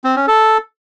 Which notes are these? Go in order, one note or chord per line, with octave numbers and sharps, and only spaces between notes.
C4
C#4
A4